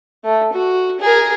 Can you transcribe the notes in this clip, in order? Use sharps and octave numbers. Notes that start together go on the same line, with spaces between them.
A3
F#4
G#4 A#4